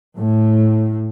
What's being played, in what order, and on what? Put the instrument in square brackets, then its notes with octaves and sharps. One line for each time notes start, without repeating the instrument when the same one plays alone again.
[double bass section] A2